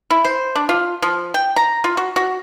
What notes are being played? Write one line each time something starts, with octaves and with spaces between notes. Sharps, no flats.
E4
C5
D4
F4
F3
G5
A#5
F4
F#4
F#4